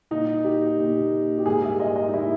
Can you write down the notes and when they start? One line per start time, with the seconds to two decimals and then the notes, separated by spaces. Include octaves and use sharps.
0.11 A#2 A#3 D#4
0.45 G4
0.78 A#2 A#3
1.38 G4
1.46 G#2 G3 A#3 G#4
1.62 E5
1.80 D#5
1.96 D#5
2.09 D#4
2.14 G3 A#3 E4